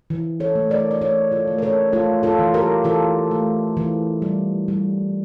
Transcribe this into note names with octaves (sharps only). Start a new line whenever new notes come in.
E3
A4 C#5
A3
A#4 D5
D5
A3 A4 C#5
F4 A4
A3
A#4
A4 C#5
A3 F4 A4
F4 A4
E3
G4 A#4
E3 F4 A4
A3
E3
G3
G3